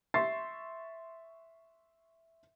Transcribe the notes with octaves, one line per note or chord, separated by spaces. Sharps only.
E5 C6 C#6 A6 C7